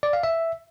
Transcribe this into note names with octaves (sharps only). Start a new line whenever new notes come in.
D5
F5
E5